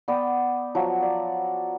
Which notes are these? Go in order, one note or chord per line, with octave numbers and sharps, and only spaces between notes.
B3 D5 G5 D#6
F3 F#3
D5